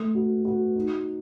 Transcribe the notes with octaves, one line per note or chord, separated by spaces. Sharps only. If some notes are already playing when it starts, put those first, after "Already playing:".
Already playing: A3
F#4
F#4
D#4